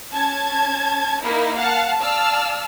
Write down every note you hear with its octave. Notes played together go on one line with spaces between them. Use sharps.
C#4 A5 G#6
A#3 D#4 E4 A#4
F5 F#5 A5
D5 F5 A5 E6 F6